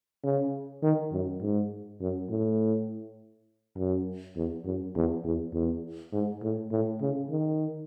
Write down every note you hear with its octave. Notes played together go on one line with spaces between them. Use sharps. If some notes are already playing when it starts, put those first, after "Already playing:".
C#3
D#3
F#2
G#2
F#2
A2
F#2
E2
F#2
E2
E2
E2
G#2
A2
A2
C#3
D#3